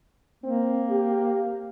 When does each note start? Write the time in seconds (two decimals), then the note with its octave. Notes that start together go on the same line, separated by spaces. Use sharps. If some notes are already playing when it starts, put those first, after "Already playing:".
0.44 A#3 C4
0.89 G4